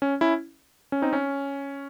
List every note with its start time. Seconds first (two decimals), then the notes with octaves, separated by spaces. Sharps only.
0.02 C#4
0.21 C#4 E4
0.92 C#4
1.02 C4 D#4
1.13 C#4